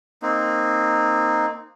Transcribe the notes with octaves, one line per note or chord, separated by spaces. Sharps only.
A#3 C4 D#4